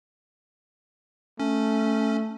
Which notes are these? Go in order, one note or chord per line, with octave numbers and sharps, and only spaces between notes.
A3 C#4